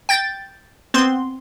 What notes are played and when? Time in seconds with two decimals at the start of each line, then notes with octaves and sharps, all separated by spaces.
0.09 G5 G6 A6
0.94 B3 C4 C6